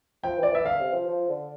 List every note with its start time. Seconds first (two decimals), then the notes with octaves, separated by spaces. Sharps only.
0.24 F3 G5
0.38 E3
0.43 F3 D5
0.51 E3 E5
0.65 D3 F5
0.80 C3
0.93 F3
1.07 F3
1.29 D3